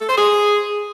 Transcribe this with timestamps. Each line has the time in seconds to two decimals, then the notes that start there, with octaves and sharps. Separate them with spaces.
0.01 A4
0.09 C5
0.17 G#4